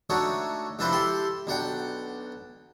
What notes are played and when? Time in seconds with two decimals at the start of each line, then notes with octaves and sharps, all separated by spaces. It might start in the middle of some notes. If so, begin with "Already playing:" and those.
0.10 A3 D4 D#4 F#4 C#5
0.79 F2 C3 D4 E4 B4 C5
0.92 E4 G4 A4 C6
1.47 B1 D4 F#5 G5